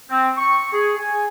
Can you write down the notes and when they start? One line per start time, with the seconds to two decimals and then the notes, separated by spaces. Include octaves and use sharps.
0.10 C4
0.38 C#6
0.73 G#4
0.98 G#5